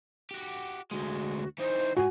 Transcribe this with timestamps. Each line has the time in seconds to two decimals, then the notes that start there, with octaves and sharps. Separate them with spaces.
0.31 F#4 G4
0.91 D2 G#3 F#4
1.58 E3 D#4 C5
1.97 G#2 F#4 G#5